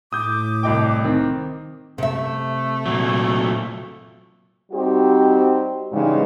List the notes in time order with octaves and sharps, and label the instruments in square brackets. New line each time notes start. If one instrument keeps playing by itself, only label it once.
[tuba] A2 [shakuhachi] D6 [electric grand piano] D#6 G6
[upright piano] C2 D#5 G5
[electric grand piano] D#3 [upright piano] C4
[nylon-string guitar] C3 E5 [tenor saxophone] A3
[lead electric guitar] A#2 F#3
[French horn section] G3 C4 D#4 F#4 G4
G#2 C#3 E3 G3 G#3 D#4